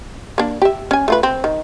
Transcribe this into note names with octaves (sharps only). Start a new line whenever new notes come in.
A#3 D4
G4 E5
C#4 G#5
A3 F4 B4
C4
D#3